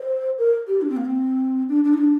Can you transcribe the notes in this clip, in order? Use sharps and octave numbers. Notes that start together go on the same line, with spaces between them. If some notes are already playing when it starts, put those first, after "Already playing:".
Already playing: C5
A#4
G4
D4
C4
A#3
C4
D4
D4
D#4
D4